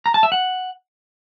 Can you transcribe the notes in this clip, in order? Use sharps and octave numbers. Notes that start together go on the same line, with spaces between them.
A#5
A5
E5
F#5